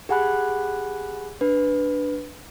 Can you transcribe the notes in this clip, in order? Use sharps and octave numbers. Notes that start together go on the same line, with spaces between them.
G4 G#4 F#5 G#5 B5 F#6
D4 B4